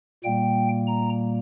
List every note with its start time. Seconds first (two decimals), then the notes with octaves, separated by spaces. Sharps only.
0.24 A#2 G3 A#3 G5
0.87 A#5